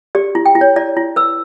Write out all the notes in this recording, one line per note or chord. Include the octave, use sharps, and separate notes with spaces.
G4 D5
E4
G5
E4
C#5
E4 D5
E4
B4 E6